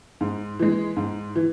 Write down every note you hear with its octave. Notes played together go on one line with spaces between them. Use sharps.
G#2
E3 G#3
G#2
E3